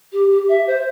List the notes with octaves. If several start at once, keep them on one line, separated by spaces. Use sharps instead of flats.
G4
G4
E5
C5